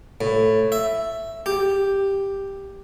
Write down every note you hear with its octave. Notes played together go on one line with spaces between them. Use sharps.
A2
E5
G4